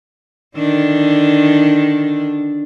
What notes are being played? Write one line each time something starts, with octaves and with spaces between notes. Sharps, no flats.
D3 D#3 D4